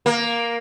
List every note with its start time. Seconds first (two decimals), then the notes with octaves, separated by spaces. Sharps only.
0.06 A#3